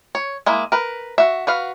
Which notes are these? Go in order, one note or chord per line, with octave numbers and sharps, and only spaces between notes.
C#5
G#3 A#3 E4
A#4 B4
F#4 E5
F#4 B4 F5